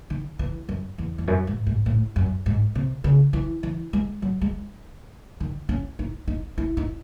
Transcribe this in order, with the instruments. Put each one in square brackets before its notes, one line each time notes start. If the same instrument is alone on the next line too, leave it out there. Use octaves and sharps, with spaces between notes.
[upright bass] D#3
E3
F#2
E2
E2
F#2
G#2
G#2
A2
F#2
G#2
C3
C#3
E3
E3
G#3
F#3
G#3
D#3
C#4
D#4
D#4
E4
D#4